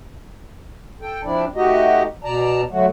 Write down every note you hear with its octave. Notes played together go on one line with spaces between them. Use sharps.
A4 G5
F3 C4 D4 E4 D5
A3 D#4 F#4 G4 D#5
B2 D5 A5 A#5
D3 F#3 A3 F#4